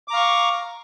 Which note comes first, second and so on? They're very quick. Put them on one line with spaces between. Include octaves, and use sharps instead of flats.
D6 A#5 F5 C#6